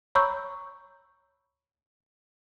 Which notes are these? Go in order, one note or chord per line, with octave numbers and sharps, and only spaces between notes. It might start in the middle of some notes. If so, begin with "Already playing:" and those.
C#5 A#5 B5 C#6 E6 G6